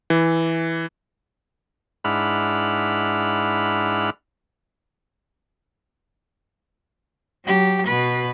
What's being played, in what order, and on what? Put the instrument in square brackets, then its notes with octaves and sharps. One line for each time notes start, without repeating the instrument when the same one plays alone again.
[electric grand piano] E3
[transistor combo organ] G#2 D4 E4 F#5 B5 F6
[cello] F#3 G4
B2 B4